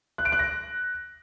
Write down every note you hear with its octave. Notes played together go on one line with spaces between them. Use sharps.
F#6
D7
F#6
A#6